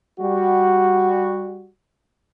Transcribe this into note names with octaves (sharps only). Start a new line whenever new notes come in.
G3 F#4